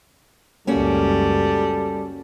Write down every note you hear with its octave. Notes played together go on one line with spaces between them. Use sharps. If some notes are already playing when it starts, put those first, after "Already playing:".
C#2 F#2 G3 A#3 C#4 F#4 A4